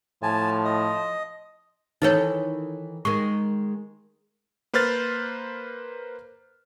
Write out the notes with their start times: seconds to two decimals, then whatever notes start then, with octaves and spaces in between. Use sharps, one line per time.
0.23 A2 F3 G#5 A5
0.65 D#5
2.02 D#3 E3 D#4 A4 B4 C#5
3.05 D#3 G#3 C#6
4.74 A#3 B4 C5 F6 A6